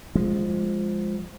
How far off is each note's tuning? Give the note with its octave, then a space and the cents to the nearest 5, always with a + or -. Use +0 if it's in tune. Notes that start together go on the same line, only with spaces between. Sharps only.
F3 +0 G#3 -15